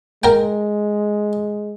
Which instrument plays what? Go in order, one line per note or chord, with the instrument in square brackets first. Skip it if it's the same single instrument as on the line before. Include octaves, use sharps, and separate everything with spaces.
[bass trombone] G#3 [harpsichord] A#4 G5